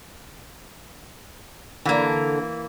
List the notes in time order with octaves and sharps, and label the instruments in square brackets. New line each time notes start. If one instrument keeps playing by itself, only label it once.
[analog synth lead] D3 [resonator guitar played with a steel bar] E3 A#3